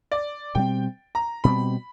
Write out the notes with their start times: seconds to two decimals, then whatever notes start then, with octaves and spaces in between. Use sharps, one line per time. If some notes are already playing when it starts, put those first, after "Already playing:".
0.12 D5
0.55 B2 G3 C4 G5
1.15 A#5
1.44 B2 G3 C4 B5